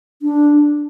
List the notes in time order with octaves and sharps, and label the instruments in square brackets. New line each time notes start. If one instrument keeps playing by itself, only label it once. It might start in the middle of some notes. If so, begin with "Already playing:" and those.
[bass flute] D4